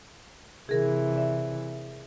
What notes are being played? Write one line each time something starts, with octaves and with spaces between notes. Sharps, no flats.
C3 E3 G#4 A#4
D5 E5